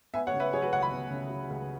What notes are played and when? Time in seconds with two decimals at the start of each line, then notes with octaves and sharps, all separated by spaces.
0.13 B3 E5 G#5
0.27 C#5 F#5
0.34 C#3
0.40 B4 E5
0.53 F#3 G#4 C#5
0.62 F#4 B4
0.72 C#2 C#5 F#5
0.82 F#5 B5
0.91 B3
1.10 C#3
1.30 F#3
1.50 C#2